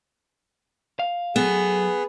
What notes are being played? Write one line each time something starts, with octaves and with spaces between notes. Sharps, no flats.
F5
F#3 B3 G#4 A4